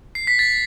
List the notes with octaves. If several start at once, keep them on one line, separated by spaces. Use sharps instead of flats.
C7
B6
A6